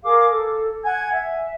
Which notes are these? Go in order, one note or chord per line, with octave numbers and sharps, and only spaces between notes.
G#4 A#4 F5 D6
A4
F#5 G#5 G#6
E5